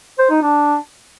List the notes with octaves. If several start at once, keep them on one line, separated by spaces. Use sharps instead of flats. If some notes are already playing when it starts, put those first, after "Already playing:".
C5
D#4
D4